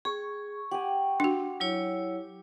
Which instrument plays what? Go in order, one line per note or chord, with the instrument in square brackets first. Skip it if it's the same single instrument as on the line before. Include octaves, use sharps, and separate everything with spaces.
[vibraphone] G#4 [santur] C#6
[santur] G4 G#5 [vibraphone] F#5
[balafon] D4 F#4
[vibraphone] F#3 E4 C#5